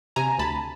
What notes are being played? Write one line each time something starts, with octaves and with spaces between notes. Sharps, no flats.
C3 G#5 A#5
D2 A5 B5